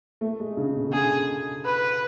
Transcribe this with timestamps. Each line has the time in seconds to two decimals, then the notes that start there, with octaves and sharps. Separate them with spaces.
0.21 A3
0.40 G#3
0.57 C#3
0.75 B2
0.86 D3
0.93 C#3 G#4
1.65 B4